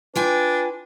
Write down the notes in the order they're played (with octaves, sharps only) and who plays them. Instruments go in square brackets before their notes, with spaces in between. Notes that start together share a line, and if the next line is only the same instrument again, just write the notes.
[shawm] D4 [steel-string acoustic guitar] F4 G5 G#5 [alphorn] B4